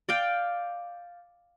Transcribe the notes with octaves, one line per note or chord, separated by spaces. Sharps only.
D5 F5 G5